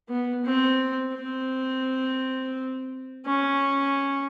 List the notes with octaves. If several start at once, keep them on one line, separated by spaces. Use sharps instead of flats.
B3
C4
C4
C#4